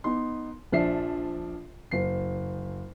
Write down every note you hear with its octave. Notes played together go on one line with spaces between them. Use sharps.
B3 D#4 C6
A#1 F3 D4 E5 C7
F#1 C7